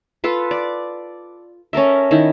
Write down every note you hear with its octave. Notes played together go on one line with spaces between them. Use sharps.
F4 A4 B4
D5
C#4 A4 A#4 E5
D#3 E4